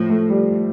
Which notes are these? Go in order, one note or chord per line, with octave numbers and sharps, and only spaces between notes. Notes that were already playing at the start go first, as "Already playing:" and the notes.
Already playing: A2 F3
A3
G3